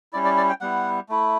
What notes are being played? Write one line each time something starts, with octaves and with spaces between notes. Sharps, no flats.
G3 C#4 E4 D5
D5
D5
G5
G3 B3 E4 F#5
A3 E4